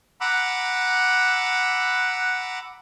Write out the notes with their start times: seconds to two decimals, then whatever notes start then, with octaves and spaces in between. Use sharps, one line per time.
0.21 F#5 A#5 B5 D6 E6 F#6